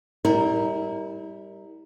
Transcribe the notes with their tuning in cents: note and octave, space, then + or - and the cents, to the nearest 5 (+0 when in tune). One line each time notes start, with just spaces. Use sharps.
G3 +0 E4 -35 A#4 +0